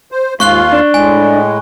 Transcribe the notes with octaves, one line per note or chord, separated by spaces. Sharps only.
C5
D#2 G#2 F4 F5 C#6 F#6 G7
D4
A2 G#3 G#5